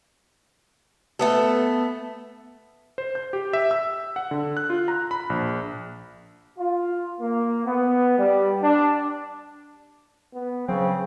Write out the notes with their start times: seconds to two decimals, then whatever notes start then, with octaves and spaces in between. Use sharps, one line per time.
1.19 A3 B3 A4
2.98 C5
3.15 G6
3.33 G4
3.53 E5
3.71 E6
4.16 F#5
4.31 D3
4.57 F#6
4.70 F4
4.88 A#5
5.11 B5
5.30 A#1
6.58 F4
7.20 A#3
7.65 B3
8.18 G3
8.62 D4
10.34 B3
10.68 C#3 F#3 C4